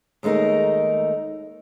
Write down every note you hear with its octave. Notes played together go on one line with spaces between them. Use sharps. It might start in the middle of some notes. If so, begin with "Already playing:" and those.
D#2 G#3 A3 D#4 A#4